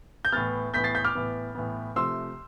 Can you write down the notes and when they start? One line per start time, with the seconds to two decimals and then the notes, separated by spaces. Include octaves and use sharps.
0.25 G6
0.32 A2 E3 B3 F6 A6
0.74 A2 E3 B3 G6 B6
0.84 A6 C7
0.95 G6 B6
1.05 D6 F6
1.15 A2 E3 B3
1.55 A2 E3 B3
1.95 C3 F3 A3 C6 E6